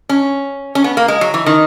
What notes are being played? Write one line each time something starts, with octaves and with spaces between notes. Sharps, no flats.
C#4
C#4
B3
A#3
G#3
F#3
E3
D#3